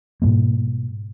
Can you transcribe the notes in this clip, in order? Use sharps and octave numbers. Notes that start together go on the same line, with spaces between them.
G#2 B2 G3 A#3